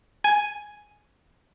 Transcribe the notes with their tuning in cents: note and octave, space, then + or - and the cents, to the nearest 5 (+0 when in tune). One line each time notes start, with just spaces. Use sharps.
G#5 +5